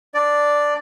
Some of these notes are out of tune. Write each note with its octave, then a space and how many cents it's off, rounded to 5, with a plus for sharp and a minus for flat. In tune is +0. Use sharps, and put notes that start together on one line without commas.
D4 +0 D5 +0